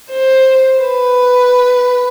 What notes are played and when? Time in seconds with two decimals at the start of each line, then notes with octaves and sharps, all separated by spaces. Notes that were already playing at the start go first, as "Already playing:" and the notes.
0.12 C5
0.81 B4